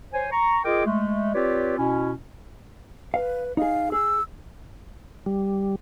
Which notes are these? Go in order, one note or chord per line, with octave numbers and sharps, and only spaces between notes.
C5 C#5 G#5
A#5 C#6
F4 G#4 A#4 D#5 G5 D6
G#3 A3
C4 F4 G4 B4 C#5 D5
B2 C#4 E4
B4 F5
D#4 G#4 F5
G#4 E6
G3